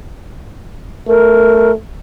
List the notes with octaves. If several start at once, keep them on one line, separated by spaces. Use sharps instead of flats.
A3 A#4